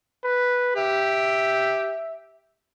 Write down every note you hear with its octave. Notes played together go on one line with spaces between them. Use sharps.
B4
G4 E5